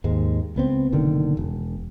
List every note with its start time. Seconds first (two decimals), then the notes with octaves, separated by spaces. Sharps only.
0.04 D#2 G#2 G#3
0.56 C#2 B3 C4
0.92 F#1 B2 D3 D#3
1.37 E1